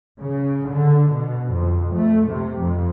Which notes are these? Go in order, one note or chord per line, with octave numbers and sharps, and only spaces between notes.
C#3
D3
B2
F2
A3
C3
F2